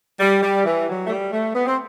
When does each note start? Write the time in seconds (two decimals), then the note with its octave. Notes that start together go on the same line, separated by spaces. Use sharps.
0.20 G3
0.43 G3
0.65 E3
0.88 F#3
1.06 A3
1.10 G3
1.32 A3
1.55 B3
1.66 C4